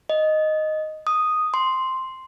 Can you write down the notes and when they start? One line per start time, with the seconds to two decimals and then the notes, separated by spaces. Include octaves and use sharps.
0.09 D#5
1.07 D#6
1.54 C6